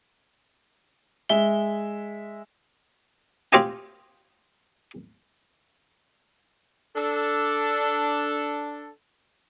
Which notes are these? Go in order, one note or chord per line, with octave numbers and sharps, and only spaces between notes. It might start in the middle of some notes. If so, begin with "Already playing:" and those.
G#3 E5 G7
C4 F4 G4 C5 D#5 G#5
D4 A4